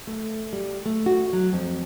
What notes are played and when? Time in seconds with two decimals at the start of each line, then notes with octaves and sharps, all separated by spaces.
0.07 A3
0.53 G3
0.86 A3
1.06 F#4
1.33 F#3
1.53 F2